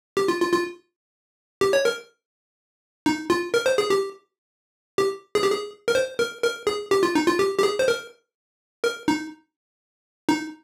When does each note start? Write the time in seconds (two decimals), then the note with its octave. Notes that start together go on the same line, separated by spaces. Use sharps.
0.17 G4
0.28 F4
0.41 F4
0.53 F4
1.61 G4
1.73 C#5
1.85 A#4
3.06 D#4
3.30 F4
3.54 A#4
3.66 C5
3.78 G#4
3.90 G4
4.98 G4
5.35 G#4
5.43 G4
5.51 G#4
5.88 A#4
5.95 C5
6.19 A#4
6.43 A#4
6.67 G#4
6.91 G4
7.03 F4
7.15 D#4
7.27 F4
7.39 G4
7.59 G4
7.63 G#4
7.79 C5
7.88 A#4
8.84 A#4
9.08 D#4
10.29 D#4